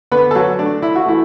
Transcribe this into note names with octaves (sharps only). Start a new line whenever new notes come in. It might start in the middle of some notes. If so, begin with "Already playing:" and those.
D3 B3 B4
A4
F#3 F#4
A3 D4
E4
F#4
E3 A3 E4